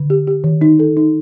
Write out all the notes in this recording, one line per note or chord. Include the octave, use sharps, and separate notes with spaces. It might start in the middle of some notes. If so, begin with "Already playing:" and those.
Already playing: D3
G4
G4
D#3
D#4
A4
D#4